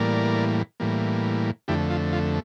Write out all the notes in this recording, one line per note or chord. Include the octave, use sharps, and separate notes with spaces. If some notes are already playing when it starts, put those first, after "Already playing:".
Already playing: A2 E3 G3 A#3 A#4 D5
A2 E3 G3 A#3
F2 D3 A3 E4 G4
F4
F4